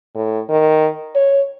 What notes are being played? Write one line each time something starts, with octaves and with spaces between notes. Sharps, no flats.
A2
D#3
C#5